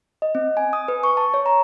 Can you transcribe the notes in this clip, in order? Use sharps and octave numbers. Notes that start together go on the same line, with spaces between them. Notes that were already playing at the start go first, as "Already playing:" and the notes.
D#5
C4
G#5
D#6
B4
C#6
A5
C#5
A#5